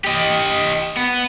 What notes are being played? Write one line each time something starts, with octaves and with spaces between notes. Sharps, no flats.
G4 D#5
B3